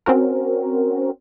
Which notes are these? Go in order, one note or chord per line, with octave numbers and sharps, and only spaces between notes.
C4 C#4 F#4 A#4